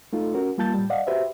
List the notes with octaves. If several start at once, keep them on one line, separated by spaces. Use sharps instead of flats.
A3 D#4 F4 A4
C#4 F#4 A#4
G3 A#3 F4 A5 G6 A6
A2 G3
D5 D#5 F5 F#5
F#4 G4 B4 C5 E5